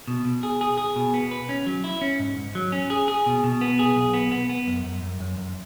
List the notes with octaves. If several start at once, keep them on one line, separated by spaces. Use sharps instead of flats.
B2
B2
G#4
G#4
G#4
B2
B3
B4
C#4
F#3
E4
C#4
G#2
G#2
F#3
C#4
G#4
G#4
B2
B2
B3
G#4
B1
B3
B3
B3
F#2
F#2
F#2
F#2
F#2